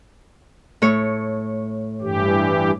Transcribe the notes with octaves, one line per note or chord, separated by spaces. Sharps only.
A2 C#5
G2 E3 G4